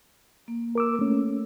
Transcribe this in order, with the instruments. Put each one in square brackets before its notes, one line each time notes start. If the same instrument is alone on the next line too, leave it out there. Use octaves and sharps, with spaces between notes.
[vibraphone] A#3
[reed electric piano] A#4 D6 E6
A3 C#4